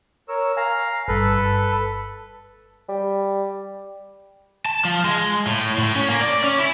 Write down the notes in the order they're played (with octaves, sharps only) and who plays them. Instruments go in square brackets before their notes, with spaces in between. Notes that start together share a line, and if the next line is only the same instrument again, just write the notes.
[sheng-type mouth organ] A#4 C#5 E6
[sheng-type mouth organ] F5 A#5 [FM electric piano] G#5
[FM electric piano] G1 G2 [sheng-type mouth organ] A4 B4
[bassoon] G3
[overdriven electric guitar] A5
F3
G#3
A2
A2
C#4
A#3
D5
C#4
E4